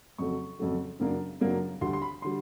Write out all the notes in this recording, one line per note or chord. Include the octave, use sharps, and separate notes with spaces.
F2 C#3 F#3 A3 C#6
F2 C#3 F#3 A3
F#2 C#3 F#3 A#3 D4
F#2 C#3 F#3 A#3 D4
D2 D3 G3 C6
C6
B5
D3 G3 C6